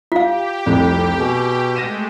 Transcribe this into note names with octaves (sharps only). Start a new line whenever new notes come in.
F4 G4 F5 B6
F1 C2 F2
B2 G#4
G#3 A3 A#6 D#7 E7